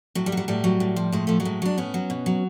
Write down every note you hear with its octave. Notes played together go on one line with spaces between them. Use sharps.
A2 F#3
G3
F#3
G3
A2 G3
F#3
A2
F3
A2 G#3
F3 A3
F#3 G#3
A2
F#3 D4
A2 B3 C#4
F#3
B2
F#3